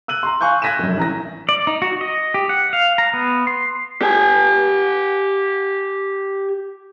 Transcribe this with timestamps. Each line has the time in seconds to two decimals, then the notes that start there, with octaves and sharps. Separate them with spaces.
0.08 E6 F#6 D#7 F#7
0.23 A#5 C6
0.41 F5 G#5 C#6 F#6 G6
0.62 F#6 G#6 A#6 B6 D#7 E7
0.79 F1 F#2
0.98 A1 A#5 A#6
1.49 D5
1.67 D#4
1.82 F#4
2.01 D#5
2.34 G4
2.49 F#5
2.73 F5
2.98 A#5
3.14 B3
3.47 C6
4.02 G4 G#5